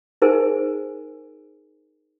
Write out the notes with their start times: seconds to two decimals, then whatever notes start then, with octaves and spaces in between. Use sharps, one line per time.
0.22 D#4 G#4 A#4 C5 G#5